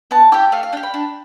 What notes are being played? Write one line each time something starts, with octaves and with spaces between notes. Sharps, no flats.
B3 A5
E4 G4 G5
A3 F5
F5
D4 G4 G5
B5
D4